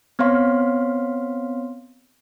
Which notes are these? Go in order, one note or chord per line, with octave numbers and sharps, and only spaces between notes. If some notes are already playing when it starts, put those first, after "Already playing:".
B3 C4 C#5 F5 C6